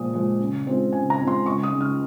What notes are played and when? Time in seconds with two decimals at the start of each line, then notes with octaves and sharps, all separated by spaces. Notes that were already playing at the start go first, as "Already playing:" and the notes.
Already playing: A#2 F3 G#3 D#6
0.13 F3 G#3
0.39 C#3
0.67 G#3 C4 F4
0.93 C#3 G#5
1.10 A#5
1.19 G#3 C4 F4
1.28 C6
1.46 C#2 C#6
1.63 D#6
1.72 C#3 G#3
1.81 F6